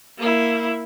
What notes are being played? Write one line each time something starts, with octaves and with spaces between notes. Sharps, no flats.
A#3 E4